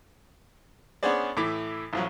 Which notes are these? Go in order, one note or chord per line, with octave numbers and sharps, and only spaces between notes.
B3 C#4 D4 G#4 C5 D5
A2 E3 E4 D6
A1 F3 F#3